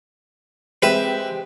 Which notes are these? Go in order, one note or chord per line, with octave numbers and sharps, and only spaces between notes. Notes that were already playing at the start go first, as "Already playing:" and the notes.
G#3 C4 G4 B4 E5